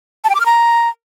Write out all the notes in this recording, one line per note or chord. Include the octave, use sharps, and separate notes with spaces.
A5
G5
D6
F6
A#5